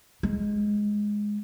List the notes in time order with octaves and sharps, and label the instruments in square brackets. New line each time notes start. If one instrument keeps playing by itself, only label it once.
[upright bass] G#3